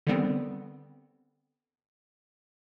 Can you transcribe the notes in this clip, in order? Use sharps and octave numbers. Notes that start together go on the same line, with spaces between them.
D3 D#3 G3 B3 C4